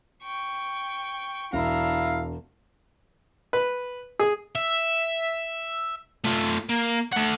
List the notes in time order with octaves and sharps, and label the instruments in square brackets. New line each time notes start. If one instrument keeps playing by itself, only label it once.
[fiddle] G5 C#6
[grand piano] E1 [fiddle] D4 A#5 [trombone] E4 [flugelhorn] F5
[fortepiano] B4
G#4
[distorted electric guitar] E5
A3 F4
A#3
A3 F#5